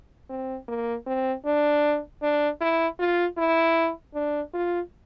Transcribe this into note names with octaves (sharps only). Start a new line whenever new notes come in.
C4
A#3
C4
D4
D4
E4
F4
E4
D4
F4